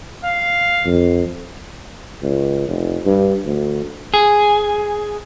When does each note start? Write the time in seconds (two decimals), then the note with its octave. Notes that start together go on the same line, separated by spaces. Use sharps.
0.25 F5
0.86 F2
2.23 C#2
2.68 F1
3.06 G2
3.46 D2
4.14 G#4